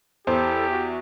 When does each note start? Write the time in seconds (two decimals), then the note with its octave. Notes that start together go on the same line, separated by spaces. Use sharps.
0.27 E2 E4 G4 A4 C5
0.69 F#4 E5